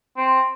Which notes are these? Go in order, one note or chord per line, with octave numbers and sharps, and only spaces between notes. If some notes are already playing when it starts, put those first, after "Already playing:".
C4